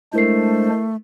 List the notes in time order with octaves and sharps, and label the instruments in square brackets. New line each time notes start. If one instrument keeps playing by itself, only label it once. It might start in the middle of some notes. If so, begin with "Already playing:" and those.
[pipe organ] G#3 D4 C5 [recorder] A3 [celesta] E4 A#4 C7